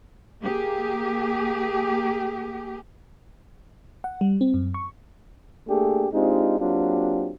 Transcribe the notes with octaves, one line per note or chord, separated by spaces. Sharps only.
A#3 G4 G#4
F#5
G3
C4
F#2
C#6
A3 A#3 D4 G4 G#4
G#3 C4 D4 D#4 F4 G4
F#3 A#3 C4 D4 F4 G4